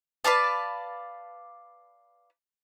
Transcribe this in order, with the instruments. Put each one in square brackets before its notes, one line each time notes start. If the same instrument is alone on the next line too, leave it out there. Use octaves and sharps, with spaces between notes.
[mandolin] B4 D5 F5 A5